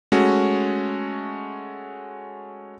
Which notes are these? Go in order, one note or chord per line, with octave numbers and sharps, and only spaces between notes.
G#3 A3 C#4 F#4